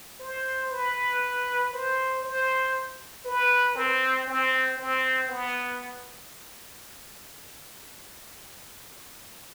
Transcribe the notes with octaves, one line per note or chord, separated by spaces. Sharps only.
C5
B4
C5
C5
B4
C4
C4
C4
B3